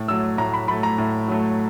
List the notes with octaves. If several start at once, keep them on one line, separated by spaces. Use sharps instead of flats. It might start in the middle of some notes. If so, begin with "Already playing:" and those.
Already playing: A2
F#3 A3 E6
A2 A#5
B5
F#3 A3 B5
A#5
A2
F#3 A3